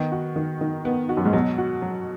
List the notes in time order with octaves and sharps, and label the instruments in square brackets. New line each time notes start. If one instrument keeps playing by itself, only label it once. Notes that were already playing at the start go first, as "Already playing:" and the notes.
Already playing: [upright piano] D#3 [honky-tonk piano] B3
[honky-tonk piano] F#4
D#3
D#3
B3
F#4
[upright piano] F#2
G#2
[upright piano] B2 [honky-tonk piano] F#3
[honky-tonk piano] F#4
F#3